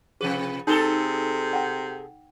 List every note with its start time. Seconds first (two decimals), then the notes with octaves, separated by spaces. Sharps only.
0.21 C3 F3 G#4 B4
0.67 C3 D#4 G#4 A4
1.53 F#5 G5